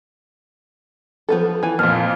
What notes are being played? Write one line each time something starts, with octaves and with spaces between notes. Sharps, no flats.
F3 B3 A4
E3 G#5
F2 A#2 A#3 F6